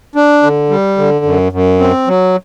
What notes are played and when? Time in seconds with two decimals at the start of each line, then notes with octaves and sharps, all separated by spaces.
0.15 D4
0.43 D3
0.70 G3
0.98 D3
1.25 F#2
1.52 F#2
1.80 C4
2.07 F#3